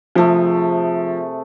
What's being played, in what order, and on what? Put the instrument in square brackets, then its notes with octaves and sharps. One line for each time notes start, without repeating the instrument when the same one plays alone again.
[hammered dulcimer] C3 A3 G#4 [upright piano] F3